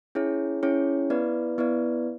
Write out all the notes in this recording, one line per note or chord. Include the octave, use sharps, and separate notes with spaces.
C#4 E4 G#4 C#5
C#4 E4 G#4 C#5
B3 E4 B4 D5
B3 E4 B4 D5